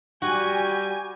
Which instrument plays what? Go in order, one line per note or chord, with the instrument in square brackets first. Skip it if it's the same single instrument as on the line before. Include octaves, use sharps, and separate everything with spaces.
[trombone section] G3 G4 [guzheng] F#4 [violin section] G#5